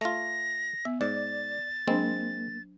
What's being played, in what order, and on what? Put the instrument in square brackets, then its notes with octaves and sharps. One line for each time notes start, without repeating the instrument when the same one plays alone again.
[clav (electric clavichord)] A3 F4 [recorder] A#6
[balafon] B3 [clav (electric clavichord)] E5
[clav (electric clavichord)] G#2 [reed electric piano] D5 [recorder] A6
[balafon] F#3 D4 C5 [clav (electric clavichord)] G#3 C4 [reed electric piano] A#3